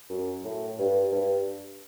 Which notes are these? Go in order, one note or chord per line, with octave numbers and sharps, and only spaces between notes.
F#2
A2
G2
G2